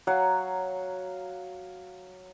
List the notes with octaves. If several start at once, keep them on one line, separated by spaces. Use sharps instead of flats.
F#3 F5 F#5